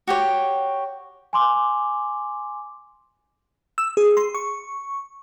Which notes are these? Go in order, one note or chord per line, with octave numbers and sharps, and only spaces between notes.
F#4 G4 C#5
G#5 C6 D6
E6
G#4
C6
C#6